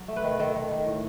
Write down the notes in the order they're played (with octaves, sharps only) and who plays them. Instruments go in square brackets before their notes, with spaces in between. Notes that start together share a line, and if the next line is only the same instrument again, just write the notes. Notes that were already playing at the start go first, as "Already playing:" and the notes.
Already playing: [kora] F#3
A3
B4
D#3
D#3 A4
D#3
D#3
A2